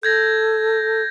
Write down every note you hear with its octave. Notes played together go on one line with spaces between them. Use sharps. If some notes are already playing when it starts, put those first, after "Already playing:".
A4 G6 G#6 A#6